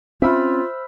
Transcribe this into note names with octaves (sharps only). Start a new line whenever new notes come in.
C4 C#4 F4 C5 E5 B5 E6 F6